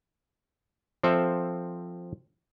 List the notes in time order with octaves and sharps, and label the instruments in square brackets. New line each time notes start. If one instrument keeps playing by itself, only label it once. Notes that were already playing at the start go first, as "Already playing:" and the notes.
[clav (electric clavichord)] F3 C4 A4 E5